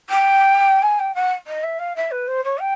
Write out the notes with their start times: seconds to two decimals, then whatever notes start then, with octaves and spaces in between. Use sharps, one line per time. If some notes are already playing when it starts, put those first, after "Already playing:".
0.10 G5
0.82 G#5
0.99 G5
1.15 F#5
1.47 D#5
1.63 E5
1.79 F5
1.96 E5
2.11 B4
2.27 C5
2.44 C#5
2.60 G5